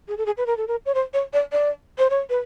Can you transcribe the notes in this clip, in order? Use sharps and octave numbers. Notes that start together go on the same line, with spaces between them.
G#4
A4
G#4
B4
A#4
A4
A#4
C#5
C5
C#5
D5
D5
C5
C#5
B4